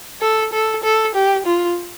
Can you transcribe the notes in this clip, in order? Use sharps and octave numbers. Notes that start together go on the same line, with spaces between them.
A4
A4
A4
G4
F4